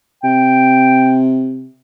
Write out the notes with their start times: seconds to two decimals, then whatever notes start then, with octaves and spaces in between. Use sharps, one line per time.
0.23 C3 G5